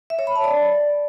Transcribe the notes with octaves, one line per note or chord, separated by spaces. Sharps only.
E5
C#5
B5
A5
D5